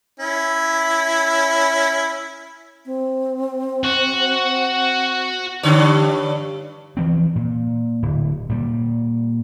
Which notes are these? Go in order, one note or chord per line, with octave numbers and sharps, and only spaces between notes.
C#4 E4
C4
F#4
G2 D3 C#5
E3 F3 C4
A#2
D1
A#2 G3